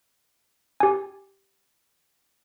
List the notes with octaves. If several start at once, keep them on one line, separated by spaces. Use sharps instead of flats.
G4 G#5